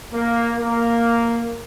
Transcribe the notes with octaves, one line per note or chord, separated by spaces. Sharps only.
A#3
A#3